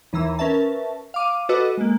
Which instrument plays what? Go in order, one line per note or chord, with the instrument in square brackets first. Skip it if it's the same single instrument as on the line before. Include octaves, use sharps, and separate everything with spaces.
[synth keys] D#2 E3 A#5 E6
C#4 A#4 B4 E5 A5
F5 D6 D#7
F#4 A4 B4 D#5 D6 E6
G#3 A#3